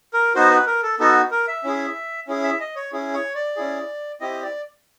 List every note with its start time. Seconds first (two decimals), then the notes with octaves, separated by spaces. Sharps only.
0.14 A#4
0.35 B3 D#4 F#4 C5
0.50 B4
0.67 A#4
0.83 A4
0.99 B3 D#4 F#4 A4
1.31 A#4
1.48 E5
1.64 C#4 E4 G#4
2.28 C#4 E4 G#4
2.44 E5
2.60 D#5
2.76 C#5
2.93 C#4 E4 G#4
3.14 C#5
3.35 D5
3.56 C#4 E4 G#4
4.21 C4 E4 G4 D#5
4.42 D5